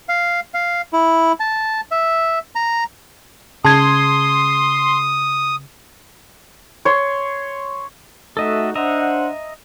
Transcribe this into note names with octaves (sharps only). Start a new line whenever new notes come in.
F5
F5
E4
A5
E5
A#5
C#3 A5 C6 D#6 G#6
C#5 C6
A3 D#4 F#4 A4 D#5 E5
D4 C5 D#5 E5 F#5 A#5